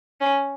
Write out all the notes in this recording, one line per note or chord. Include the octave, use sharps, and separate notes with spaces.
C#4